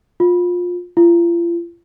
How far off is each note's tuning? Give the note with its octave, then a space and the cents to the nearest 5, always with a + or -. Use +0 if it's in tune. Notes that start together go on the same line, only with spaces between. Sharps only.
F4 +25
F4 -40